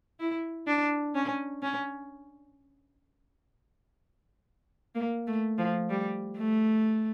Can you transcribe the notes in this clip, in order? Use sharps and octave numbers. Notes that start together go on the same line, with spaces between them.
E4
D4
C#4
C#4
A#3
A3
F3
G3
A3